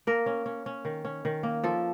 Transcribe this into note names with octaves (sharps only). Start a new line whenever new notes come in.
A#3 A#4
C#4
C#4
C#4
D#3
C#4
D#3
A#3
F3 A4